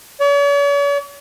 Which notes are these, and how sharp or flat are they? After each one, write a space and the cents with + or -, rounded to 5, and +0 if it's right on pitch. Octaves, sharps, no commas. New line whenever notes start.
C#5 +45